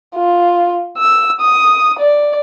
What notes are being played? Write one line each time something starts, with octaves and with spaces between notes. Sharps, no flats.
F4
E6
D#6
D5